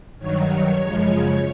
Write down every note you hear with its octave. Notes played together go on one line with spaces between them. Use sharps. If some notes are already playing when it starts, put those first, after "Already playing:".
G2 D#3 F#3 C#5
F#2 C#3 F3 G#3